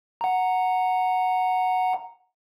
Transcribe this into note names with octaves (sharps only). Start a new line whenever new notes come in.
F#5 A#5